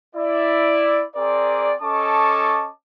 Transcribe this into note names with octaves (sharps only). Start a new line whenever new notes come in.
E4 D5
C4 G#4 A#4 D5
C#4 A4 D#5 A5 C#6 D6